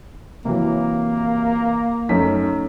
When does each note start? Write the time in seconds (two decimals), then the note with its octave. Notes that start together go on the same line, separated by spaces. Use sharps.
0.45 C3 E3 F#3 A#3
2.09 F#2 A3 C#4 D#4 B6